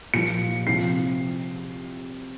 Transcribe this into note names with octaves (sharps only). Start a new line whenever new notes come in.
A#2 F3 C#7
C3 F3 C7